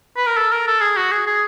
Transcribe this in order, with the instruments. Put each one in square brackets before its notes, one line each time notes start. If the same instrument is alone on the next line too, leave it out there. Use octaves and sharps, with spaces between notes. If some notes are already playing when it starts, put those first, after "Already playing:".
[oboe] B4
A#4
A4
A#4
A4
G#4
F#4
G#4
G#4